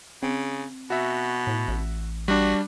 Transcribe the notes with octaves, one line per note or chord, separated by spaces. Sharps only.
C#3 C4
B2 F#4 E5
A2
A1
G3 D4 F#4